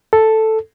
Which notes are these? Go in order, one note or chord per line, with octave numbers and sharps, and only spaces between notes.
A4